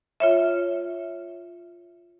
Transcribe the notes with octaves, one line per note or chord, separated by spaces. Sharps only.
F4 C#5 E5